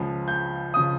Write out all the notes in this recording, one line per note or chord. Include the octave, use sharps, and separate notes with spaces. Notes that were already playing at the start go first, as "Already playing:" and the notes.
Already playing: C#2 C#3 F3
G6
C#3 F3 D#6